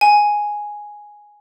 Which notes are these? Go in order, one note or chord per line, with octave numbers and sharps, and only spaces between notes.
G#5